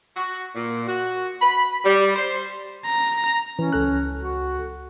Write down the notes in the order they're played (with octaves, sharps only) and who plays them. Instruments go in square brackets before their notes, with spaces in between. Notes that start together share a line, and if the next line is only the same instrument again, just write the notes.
[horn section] F#4
A#2
F#4
B5
G3
C5
[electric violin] A#5
[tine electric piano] E3 [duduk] C#4
[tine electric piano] C#2 A4 F#6
[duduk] F#4